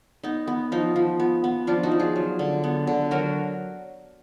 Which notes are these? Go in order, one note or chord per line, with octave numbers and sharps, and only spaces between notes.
B3 D#4
B3
F3 D#4
F3
B3
B3
F3 D4 F4
D#4 F#4
F3
F4 G#4
F#3
D3
B3
D3
F#3 F#4 A#4